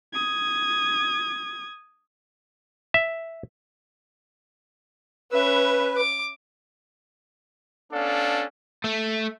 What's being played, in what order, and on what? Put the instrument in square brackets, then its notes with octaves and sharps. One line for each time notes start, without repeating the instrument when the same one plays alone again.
[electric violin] D#6 G#6
[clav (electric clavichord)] E5
[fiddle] C#4 E5 [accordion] B4
[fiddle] D6
[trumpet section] B3 C#4 D4 A4 D5 F5
[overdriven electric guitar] A3